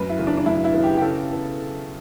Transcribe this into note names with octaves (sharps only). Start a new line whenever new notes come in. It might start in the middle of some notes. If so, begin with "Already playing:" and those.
Already playing: F#2 B4
E4
C#3 E3 B3
D4
D4
F#2 E4
E4
C#3 E3 B3
G4
G4
C#3 A4
E3 B3